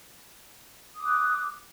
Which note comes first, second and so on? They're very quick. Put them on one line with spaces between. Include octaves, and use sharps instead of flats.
D#6 D6 F#6